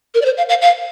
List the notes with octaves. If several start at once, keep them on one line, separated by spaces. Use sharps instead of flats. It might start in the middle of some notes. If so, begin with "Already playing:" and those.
A#4
D5
C5
F5
F5
F5